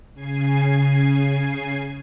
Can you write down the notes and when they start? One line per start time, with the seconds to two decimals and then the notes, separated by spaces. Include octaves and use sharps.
0.14 C#3 G#5 C7